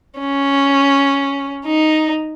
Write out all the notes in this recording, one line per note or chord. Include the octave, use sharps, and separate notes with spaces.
C#4
D#4